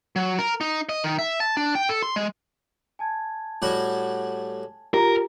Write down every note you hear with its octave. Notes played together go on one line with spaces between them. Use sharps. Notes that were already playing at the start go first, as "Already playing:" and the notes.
F#3
A#4
D#4
D#5
D#3
E5
A5
D4
G5
A4
C6
G#3
G#5 A5 G#6
A2 G3 F#4
F4 G4 A#4 A#5